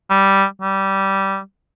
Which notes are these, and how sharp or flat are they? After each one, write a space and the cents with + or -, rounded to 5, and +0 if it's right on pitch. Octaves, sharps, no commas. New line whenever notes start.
G3 -5
G3 -15